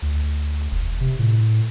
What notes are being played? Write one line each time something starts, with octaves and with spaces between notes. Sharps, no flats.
D2
E1
C3
A2